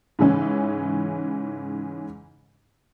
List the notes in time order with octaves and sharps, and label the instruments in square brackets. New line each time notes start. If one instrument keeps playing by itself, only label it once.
[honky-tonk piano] G#2 C#3 E3 C#4